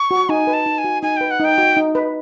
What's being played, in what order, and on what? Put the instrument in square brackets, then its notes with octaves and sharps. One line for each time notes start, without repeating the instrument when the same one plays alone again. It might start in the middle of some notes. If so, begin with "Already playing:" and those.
Already playing: [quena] C#6
[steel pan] F#4
[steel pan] D#4 [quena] G#5
[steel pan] B4
[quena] A5
[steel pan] D#4
[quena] G#5
[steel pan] F#4
[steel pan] D#4 [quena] G#5
[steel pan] B4 [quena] G5
[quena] F#5
[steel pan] D#4 [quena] G5
[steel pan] F#4
D#4
B4